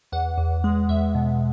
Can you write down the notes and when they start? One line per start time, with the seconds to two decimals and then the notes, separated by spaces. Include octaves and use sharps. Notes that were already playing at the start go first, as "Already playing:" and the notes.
0.12 E2 F#5
0.38 E2
0.64 G#3
0.89 E2 E5
1.15 B2